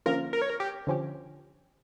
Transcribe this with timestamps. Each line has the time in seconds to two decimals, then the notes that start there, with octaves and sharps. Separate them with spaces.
0.06 D3 F3 A#3 C#4 F4 A#4
0.33 A#4
0.42 C#5
0.50 A#4
0.60 G4
0.87 D3 F3 C#4 G4